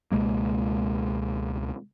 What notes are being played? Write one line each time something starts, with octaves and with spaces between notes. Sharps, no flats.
C#2 B2 G#3 A#3